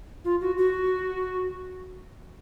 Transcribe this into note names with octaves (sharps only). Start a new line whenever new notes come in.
F4
F#4
F#4